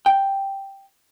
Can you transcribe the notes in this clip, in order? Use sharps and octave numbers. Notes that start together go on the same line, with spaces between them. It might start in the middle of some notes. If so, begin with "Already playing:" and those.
G5